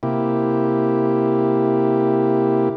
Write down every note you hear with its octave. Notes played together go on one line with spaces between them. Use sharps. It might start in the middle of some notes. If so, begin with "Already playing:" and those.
C3 A#3 E4 G4